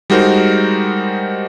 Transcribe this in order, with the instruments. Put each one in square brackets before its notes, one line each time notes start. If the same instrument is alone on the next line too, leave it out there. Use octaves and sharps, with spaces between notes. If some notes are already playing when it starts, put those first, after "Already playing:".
[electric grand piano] G3 G#3 D#4 F#4 A#4 C5